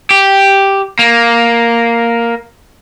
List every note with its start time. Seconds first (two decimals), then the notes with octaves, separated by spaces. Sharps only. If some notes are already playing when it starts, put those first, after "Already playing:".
0.11 G4
0.99 A#3